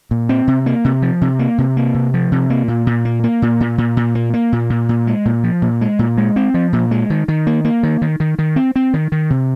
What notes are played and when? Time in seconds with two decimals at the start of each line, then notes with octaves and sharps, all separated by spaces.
0.11 A#2
0.29 C4
0.47 C3
0.66 A#3
0.85 C3
1.02 F3
1.21 C3
1.39 A#3
1.58 C3
1.77 A#3
1.94 C3
2.14 F3
2.32 C3
2.50 A#3
2.68 A#2
2.87 A#2
3.05 A#3
3.24 A#3
3.42 A#2
3.60 A#2
3.78 A#2
3.97 A#2
4.15 A#3
4.34 A#3
4.52 A#2
4.70 A#2
4.89 A#2
5.07 G#3
5.25 A#2
5.44 F3
5.62 A#2
5.81 G#3
5.99 A#2
6.17 G#3
6.36 C4
6.54 F3
6.73 A#2
6.91 G#3
7.10 D#3
7.28 D#3
7.47 A#3
7.65 A#3
7.83 D#3
8.02 D#3
8.20 D#3
8.39 D#3
8.56 C4
8.76 C4
8.94 D#3
9.12 D#3
9.30 C3